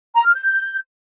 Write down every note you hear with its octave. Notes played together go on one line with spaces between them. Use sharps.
A#5
F6
G6